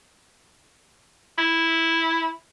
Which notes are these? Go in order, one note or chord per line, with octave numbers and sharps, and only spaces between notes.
E4